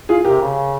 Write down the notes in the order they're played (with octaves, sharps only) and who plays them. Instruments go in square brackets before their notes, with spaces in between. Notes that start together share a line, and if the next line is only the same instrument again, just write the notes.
[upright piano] F4 G#4
[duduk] C3 [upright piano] G4 A#4
[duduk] C#3